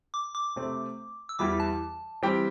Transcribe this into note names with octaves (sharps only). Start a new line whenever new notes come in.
D6
D6
C3 A3 C4
E6
E2 E3 G3 E4 G4 D6
A5
E3 G3 C4 G4 G5